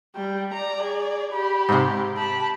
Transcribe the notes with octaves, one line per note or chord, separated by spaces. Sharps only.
G3 G5
D5 A#5
G#4
G4 B5
G#2 C3
G4 A5 B5